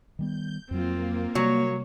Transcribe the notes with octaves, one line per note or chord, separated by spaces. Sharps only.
D#3 G3 B3 G6
F2 F#3 A#3 C4 F4
C3 F#3 G3 C#5